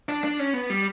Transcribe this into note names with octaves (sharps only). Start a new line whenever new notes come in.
D4
D4
C#4
B3
G3